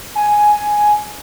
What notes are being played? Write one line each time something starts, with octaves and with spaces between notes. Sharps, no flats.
G#5